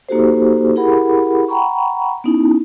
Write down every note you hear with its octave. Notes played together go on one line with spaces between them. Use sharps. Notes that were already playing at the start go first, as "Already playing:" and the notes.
A#3 D#4 F#4 G4 A4 C5
E4 G4 G#4 A#4 F#5 B5
F#5 G5 A#5 B5 C#6
B3 C#4 D#4 E4